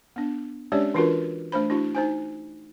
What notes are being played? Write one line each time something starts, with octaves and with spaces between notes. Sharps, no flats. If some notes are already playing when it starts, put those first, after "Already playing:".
B3 D4
G#3 C#4 D4 G4 C#5 D5
E3 D4 F4 F#4 A#4 B4
A3 D4 C5 B5
D4 E4 F#4
D#4 C5 G#5